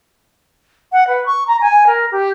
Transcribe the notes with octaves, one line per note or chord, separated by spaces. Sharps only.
F#5
B4
C#6
A#5
G#5
A#4
G4